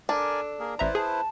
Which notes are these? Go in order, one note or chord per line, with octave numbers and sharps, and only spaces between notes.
D4 A4 A#4 D5 G#5
A#3 G#4 A#4
A1 E4 B4 C5 D5 E5 A#5
G#4 A5